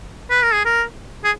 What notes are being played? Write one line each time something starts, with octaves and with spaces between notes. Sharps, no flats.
B4
A#4
G#4
A#4
G#4